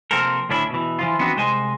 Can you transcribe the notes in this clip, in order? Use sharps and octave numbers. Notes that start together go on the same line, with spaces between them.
C3 F3 A#3 C4 A4 A#4
D2 A2 C#4 D4 E4
B2 E3
E3 F3 F4
E3 B3 C4 D4 D#4 F#4
C2 G#3 C5 D#5 G#5